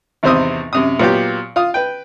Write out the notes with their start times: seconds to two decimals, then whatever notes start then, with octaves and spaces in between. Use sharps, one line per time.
0.23 G#1 E2 C3 C5 E5 D#6
0.73 F#2 C3 D#6
0.99 A#2 F#3 B3 F4 G4
1.56 F4 D#6
1.74 B4 G5